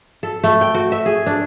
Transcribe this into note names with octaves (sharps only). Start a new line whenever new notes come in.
A4
A3
G5
F#4
E5
G#4
D4